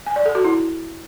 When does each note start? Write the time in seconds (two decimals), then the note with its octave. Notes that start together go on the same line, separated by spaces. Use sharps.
0.07 G#5
0.16 D5
0.26 A4
0.35 F#4
0.45 E4